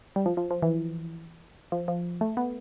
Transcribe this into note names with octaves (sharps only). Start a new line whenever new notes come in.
G3
F3
F3
F3
E3
F3
F3
A3
B3